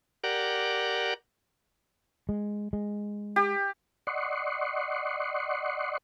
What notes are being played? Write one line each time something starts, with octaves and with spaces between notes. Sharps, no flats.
G4 A#4 D5 F#5
G#3
G#3
G4
D5 D#5 F#5 C6 C#6